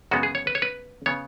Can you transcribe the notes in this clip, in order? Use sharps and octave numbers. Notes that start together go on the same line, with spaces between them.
F#2 C#3 G#3 B3 F#4
G#4
C#5
B4
C#5
B4
C#3 B3 C#5